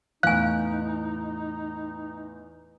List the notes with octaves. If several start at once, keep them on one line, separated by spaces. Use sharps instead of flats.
E2 A2 D#4 F5 G#5 F#6